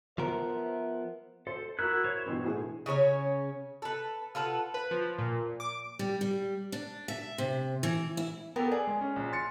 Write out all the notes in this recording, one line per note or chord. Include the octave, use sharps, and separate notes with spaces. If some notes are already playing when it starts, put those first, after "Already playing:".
F3 B3 A#4 C5 E5
A4 C5
E4 F#4 A#4 F#6
C5 C#5
G2 B2 E3
A2 E3 G#4
C#3 C#4 A#4 C#5
A4 B4
F4 A4 B4 F#5
B4
F3
A#2
D6
G3
G3
D4
E5
C3
E3
E4
B3 G4 A4 A#4
G#4 D5
G#3
C#4
A#1
C6 A6 C#7